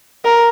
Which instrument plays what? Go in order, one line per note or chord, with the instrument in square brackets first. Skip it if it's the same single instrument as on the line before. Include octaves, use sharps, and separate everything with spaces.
[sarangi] A#4